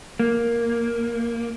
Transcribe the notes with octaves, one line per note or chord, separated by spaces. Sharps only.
A#3